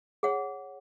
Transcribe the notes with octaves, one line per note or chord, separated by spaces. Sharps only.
G#4 C#5 F#5